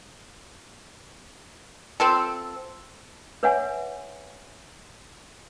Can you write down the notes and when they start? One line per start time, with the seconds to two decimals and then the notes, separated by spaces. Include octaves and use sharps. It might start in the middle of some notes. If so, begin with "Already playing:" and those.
2.00 C4 F4 A4
3.43 B4 C#5 E5 F#5 G#5